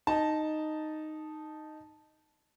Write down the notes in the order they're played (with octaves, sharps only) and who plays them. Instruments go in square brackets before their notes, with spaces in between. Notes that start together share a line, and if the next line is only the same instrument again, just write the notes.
[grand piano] D#4 A5